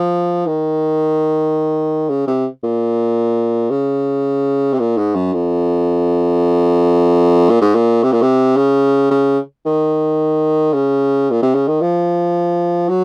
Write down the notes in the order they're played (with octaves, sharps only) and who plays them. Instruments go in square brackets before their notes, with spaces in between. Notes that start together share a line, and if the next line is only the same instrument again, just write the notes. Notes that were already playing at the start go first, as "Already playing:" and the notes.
Already playing: [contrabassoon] F3
D#3
C#3
C3
A#2
C#3
C3
A#2
G#2
F#2
F2
A#2
G#2
A#2
C3
A#2
C3
C#3
C#3
D#3
C#3
A#2
C3
C#3
D#3
F3
F#3